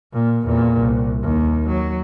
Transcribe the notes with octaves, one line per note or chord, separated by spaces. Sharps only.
A#2
E2 A#2
C2
D#2
F#3